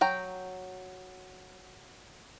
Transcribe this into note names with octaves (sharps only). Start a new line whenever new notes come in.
F#3 G5 A#5